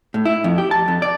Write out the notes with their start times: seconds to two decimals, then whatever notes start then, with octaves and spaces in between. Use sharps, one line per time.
0.14 A2
0.25 E4
0.44 F2
0.58 G4
0.71 A5
0.88 F2
1.02 D5